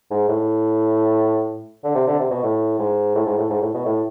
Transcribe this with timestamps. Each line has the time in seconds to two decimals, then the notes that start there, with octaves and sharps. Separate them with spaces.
0.11 G#2
0.28 A2
1.84 D3
1.95 C3
2.07 D3
2.20 C3
2.31 B2
2.43 A2
2.79 G#2
3.15 A2
3.26 G#2
3.38 A2
3.50 G#2
3.62 A2
3.74 B2
3.85 A2